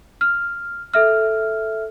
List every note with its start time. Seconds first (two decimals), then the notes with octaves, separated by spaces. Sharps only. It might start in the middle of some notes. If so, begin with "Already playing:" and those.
0.21 F6
0.94 A4 E5 F6